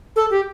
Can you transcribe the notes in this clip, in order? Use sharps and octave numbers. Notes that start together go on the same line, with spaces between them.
A4
G4